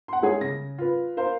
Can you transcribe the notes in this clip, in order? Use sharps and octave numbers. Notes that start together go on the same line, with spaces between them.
F#5 C6
G#3 E4 G#4 C#5
C#3 A#6
F4 B4
A#4 C5 F5